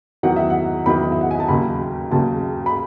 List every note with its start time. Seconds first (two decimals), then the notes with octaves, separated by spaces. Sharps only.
0.23 E2 D#3 F#3 F#5
0.36 E5
0.50 F#5
0.86 E2 D#3 F#3 B5
1.12 E5
1.21 F#5
1.31 G#5
1.40 A5
1.48 D#2 C#3 F#3 B5
2.11 D#2 C#3 F#3 A5
2.66 B5